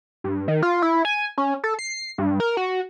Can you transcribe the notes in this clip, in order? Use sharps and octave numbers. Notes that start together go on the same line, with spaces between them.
G2
D#3
F4
E4
G#5
C#4
A4
C7
G2
A#4
F#4